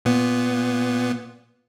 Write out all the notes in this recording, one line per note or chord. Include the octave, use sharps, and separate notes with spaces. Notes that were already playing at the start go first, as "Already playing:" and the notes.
A#2 B3